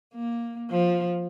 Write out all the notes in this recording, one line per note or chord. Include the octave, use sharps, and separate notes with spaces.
A#3
F3